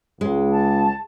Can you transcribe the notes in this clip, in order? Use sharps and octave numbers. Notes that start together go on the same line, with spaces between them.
C#2 G#3
A5